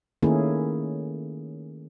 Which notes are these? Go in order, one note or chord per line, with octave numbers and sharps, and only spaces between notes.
D#3 A3 A#3 C#4 E4 G#4